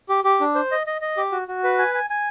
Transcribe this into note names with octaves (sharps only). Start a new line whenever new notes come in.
G4
G4
D4
C5
D#5
D#5
D#5
G4
F#4
F#4
B4
G#5
G#5
G#5